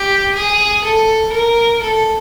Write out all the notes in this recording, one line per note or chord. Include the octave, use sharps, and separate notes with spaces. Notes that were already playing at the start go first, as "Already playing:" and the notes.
Already playing: G4
G#4
A4
A#4
A4